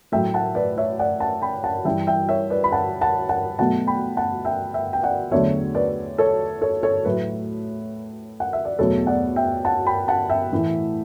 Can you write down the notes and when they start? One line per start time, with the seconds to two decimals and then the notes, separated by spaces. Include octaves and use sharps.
0.12 A2 F#3 A3 E5 G5
0.34 F#5 A5
0.55 B4 D5
0.77 C#5 E5
0.99 D5 F#5
1.20 F#5 A5
1.42 G5 B5
1.64 F#5 A5
1.85 G2 E3 G3 E5 G5
2.07 E5 G5
2.29 C#5 E5
2.50 B4 D5
2.64 B5
2.72 F#5 A5
3.01 F#5 A5
3.29 F#5 A5
3.59 B2 F#3 A3 F#5 A5
3.87 G5 B5
4.17 F#5 A5
4.45 E5 G5
4.74 E5 G5
4.93 G5
5.03 D5 F#5
5.31 E2 D3 F#3 A3 C#5 E5
5.75 B4 D5
6.18 A4 C#5
6.62 A4 C#5
6.83 A4 C#5
7.05 A2 F#3 A3 B4
8.40 F#5
8.53 E5
8.65 D5
8.79 E2 B2 F#3 A3 A4 C#5
9.07 D5 F#5
9.36 E5 G5
9.65 F#5 A5
9.86 G5 B5
10.08 F#5 A5
10.30 E5 G5
10.52 A2 E3 A3